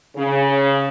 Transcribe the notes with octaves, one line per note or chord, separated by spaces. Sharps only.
C#3